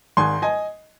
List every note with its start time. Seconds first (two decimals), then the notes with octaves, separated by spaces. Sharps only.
0.17 G#1 G#2 D#3 G#5 C6
0.42 D#5 G#5